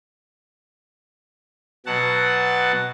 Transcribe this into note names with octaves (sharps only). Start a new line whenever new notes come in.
B2 F#3 F#5 A5